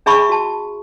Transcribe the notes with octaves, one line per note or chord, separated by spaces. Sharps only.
D4 G#4 E5 A5 B5 C#6
F#4 A5